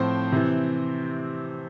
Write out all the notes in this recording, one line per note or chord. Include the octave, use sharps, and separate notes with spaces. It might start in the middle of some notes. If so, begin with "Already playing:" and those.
Already playing: A2 F3 C4 C5
C3 E3